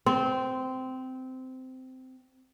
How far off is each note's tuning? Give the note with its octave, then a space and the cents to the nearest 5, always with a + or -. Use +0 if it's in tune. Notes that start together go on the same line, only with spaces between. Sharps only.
C4 -15